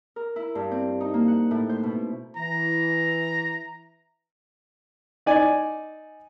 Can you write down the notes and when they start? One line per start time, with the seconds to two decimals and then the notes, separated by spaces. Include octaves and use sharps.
0.16 A#4
0.36 E4
0.55 G2
0.71 C4
1.00 D#4
1.14 A#3
1.28 F#5
1.51 A2
1.69 C5
1.83 B2
2.37 E3 A#5
5.26 D#4 D5 G#5